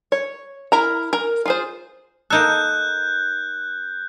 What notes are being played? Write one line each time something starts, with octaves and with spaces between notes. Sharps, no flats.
C#5
E4 A#4 A#5
A#4 A#5
F4 G#4 C5
A#3 D#4 A4 F#6 G6